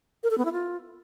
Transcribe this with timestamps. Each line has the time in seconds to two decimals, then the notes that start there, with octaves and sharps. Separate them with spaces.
0.23 A#4
0.31 A4
0.38 B3
0.45 E4
0.53 F4